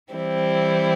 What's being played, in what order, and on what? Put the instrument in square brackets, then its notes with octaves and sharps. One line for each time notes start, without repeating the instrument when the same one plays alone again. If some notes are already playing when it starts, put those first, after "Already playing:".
[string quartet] E3 G3 C4 E4